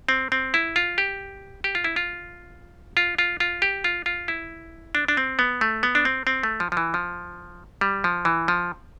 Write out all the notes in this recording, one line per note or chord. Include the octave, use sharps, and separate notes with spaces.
C4
C4
E4
F4
G4
G4
F4
E4
F4
F4
F4
F4
G4
F4
F4
E4
D4
D4
C4
B3
A3
B3
D4
C4
C4
A3
F3
F3
E3
F3
G3
F3
E3
F3